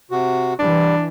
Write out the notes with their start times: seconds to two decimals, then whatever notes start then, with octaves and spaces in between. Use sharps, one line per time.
0.11 C3 F#4
0.59 E3 G3 D4